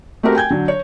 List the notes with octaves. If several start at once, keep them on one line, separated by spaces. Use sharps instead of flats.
A3 C4 F#4 G4 A#4
G5 G#5 G6 G#6
D3 F#3
C#5